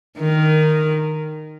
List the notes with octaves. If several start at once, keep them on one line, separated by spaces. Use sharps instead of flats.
D#3